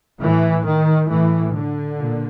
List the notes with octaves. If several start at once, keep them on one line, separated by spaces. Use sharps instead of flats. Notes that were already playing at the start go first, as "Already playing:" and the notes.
A2 E3
D#3
A2 E3
D3
A#2